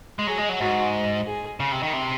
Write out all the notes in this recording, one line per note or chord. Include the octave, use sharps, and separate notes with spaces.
G#3
F#3 G#4
G#3
F#3
G#2 F#4
G#4
C#3
C3
D#3
C3